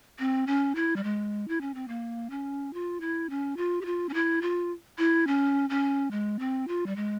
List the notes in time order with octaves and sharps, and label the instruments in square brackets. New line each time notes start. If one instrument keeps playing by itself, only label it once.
[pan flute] C4
C#4
E4
G3
G#3
E4
C#4
C4
A#3
C#4
F4
E4
C#4
F4
G4
F4
C#4
E4
F4
E4
C#4
C#4
G#3
C4
F4
G3
G#3